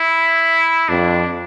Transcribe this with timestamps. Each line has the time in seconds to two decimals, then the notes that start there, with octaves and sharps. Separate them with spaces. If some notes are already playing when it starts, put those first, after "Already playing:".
Already playing: E4
0.89 F2 D4